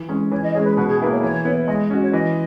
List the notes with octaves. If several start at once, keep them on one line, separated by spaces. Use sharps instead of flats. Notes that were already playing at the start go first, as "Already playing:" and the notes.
Already playing: E3
G#3 C#4 G#4
E3 C#5
D#5
G#3 C#4 G#4 C#5
B4
B2 B4
G#4
A#3 E4 G#4 B4
C#5
E3 C#5
B3 E4
G#3 D#5
C#4 F#4 D#5
C#5
E3 D#5